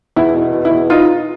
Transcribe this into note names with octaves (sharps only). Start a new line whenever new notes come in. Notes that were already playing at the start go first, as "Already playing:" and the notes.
E2 E4
B2
B2
E4
E2
D#4 F4